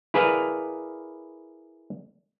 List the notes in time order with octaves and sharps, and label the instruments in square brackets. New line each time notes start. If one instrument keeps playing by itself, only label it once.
[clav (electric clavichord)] E4 G#4 A#4 B4 D5 F5